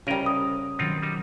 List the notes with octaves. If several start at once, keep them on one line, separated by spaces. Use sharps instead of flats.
C2 C#3 G3 A#4 C#5 D#5 A#5
D#6
B2 D#3 F#3 C4 D#4 F4
G3 D#4